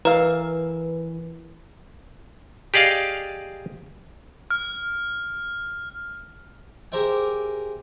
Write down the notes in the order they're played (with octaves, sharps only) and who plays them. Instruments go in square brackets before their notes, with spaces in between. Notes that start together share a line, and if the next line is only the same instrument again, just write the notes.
[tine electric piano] E3 [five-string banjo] A#4 F5 [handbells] B4
[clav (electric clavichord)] G4 G#4 D5 D#5 F5
[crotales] F6
[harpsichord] G4 G#4 A#4 C5 E5 G5